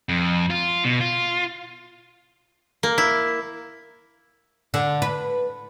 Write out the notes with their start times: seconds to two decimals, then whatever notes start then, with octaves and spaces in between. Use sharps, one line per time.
0.09 F2
0.50 F4
0.85 B2
1.01 F4
2.83 A#3
2.98 E4
4.74 D3
5.02 B4